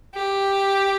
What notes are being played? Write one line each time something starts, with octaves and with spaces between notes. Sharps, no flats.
G4